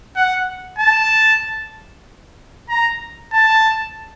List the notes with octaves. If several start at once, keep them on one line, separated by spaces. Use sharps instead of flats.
F#5
A5
A#5
A5